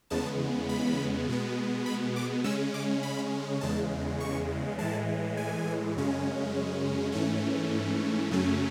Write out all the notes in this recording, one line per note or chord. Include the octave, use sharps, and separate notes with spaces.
E2 C#3 G#3 B3 A5
B5
B2 G#3 B3
B5
D6
C#3 G#3 C#4 E6
D6
B5
E2 C#3 G#3 A5
C#6
A2 E3 G#3 A5
G#5
F#2 C#3 G#3 C#4
G#2 E3 A3 C#4
F#2 C#3 F#3 A3 C#4